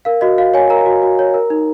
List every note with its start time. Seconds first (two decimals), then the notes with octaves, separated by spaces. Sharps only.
0.05 A#4 F5
0.21 F#4 D#5
0.38 F#4 F5
0.54 C#5 G#5
0.70 A#4 A#5
0.86 F#4
1.02 F#4
1.19 C#5
1.34 A#4
1.50 D#4